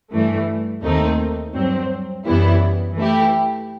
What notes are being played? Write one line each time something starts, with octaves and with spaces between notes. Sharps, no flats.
G2 E3 A3
D#2 D#3 A3 C4 D#4
G2 F#3 C4
F#2 E3 G3 B3 E4
E3 A3 E4 G4